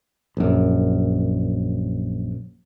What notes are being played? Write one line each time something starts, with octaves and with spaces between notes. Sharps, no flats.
A#1 F#2